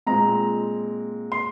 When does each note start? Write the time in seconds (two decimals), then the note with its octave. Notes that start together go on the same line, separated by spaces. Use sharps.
0.06 A#2 G#3 C4 A#5
1.32 C6